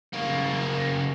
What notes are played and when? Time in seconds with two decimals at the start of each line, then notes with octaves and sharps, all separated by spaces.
0.13 C#3 A#3